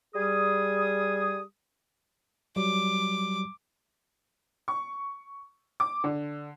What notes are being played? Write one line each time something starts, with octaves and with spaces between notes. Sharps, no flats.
G3 G#4 D#6
F#3 G3 D6
C#6
D6
D3